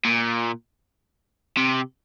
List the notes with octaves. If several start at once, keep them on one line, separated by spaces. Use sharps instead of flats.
A#2
C3